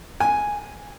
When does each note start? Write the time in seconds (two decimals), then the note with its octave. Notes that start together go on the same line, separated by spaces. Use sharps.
0.20 G#5